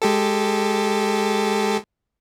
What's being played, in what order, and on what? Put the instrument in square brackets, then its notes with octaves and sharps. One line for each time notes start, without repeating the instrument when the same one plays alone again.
[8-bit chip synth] G#3 G4 A4